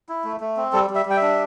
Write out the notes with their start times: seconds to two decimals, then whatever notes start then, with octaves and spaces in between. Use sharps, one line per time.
0.09 E4
0.25 A3
0.41 A3
0.57 C4
0.73 G3 A4
0.90 G3 E5
1.06 G3 G5
1.17 D4 E5